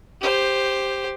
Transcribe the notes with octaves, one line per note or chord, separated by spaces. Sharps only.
G4 C5